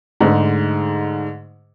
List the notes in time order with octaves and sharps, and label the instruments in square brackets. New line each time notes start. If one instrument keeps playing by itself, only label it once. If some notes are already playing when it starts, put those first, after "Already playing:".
[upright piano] G#2 D3 A3 G#4